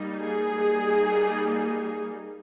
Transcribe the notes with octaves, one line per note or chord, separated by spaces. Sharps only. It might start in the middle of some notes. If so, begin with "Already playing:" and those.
Already playing: G3 A#3 D#4
G#4
G3 A#3 D#4